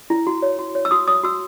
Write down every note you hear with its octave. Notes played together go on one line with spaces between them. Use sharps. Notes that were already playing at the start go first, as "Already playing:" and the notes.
E4
F#4
C#5
F#4
C#5
E6
F#4 D#6
C#5 D#6
F#4 E6